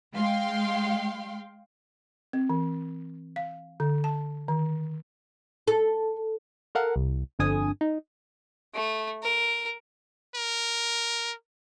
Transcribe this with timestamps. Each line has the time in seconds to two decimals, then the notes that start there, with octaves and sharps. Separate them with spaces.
0.14 G#3 F5 G5 C6
2.33 C4
2.50 E3
3.36 F5
3.80 D3
4.04 A5
4.48 D#3
5.68 A4
6.75 A4 A#4 F5 F#5
6.96 C2
7.39 G1 F2 D3 G#5 D#6
7.81 D#4
8.74 A3
9.23 A#4
10.35 A#4